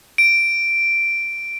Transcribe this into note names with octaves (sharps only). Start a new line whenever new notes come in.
D7